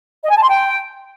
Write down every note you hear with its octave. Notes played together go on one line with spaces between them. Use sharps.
D#5
G#5
A5
C6
G5